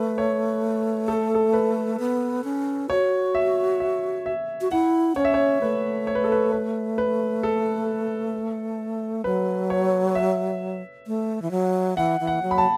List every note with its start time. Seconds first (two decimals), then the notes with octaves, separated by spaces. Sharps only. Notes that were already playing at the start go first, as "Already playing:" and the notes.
Already playing: A3 B4
0.18 C#5
1.08 A4
1.35 A4
1.53 B4
1.99 B3
2.44 C#4
2.90 F#4 C#5
3.35 E5
3.80 E5
4.26 E5
4.61 F#4
4.71 E4 F#5
5.16 C#4 C#5
5.25 E5
5.34 C#5
5.62 A3 B4
6.07 C#5
6.15 B4
6.24 A4
6.32 B4
6.52 B4
6.98 B4
7.43 A4
9.24 F#3 B4
9.70 C#5
10.15 E5
11.07 A3
11.42 E3
11.51 F#3
11.97 E3 F#5
12.20 E3
12.27 F#5
12.42 F#3
12.51 B5
12.58 A5